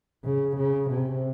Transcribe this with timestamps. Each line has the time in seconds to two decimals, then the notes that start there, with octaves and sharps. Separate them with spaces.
0.25 C#3
0.57 C#3
0.90 C3